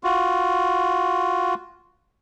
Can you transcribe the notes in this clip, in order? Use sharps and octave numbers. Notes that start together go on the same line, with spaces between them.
F4 F#4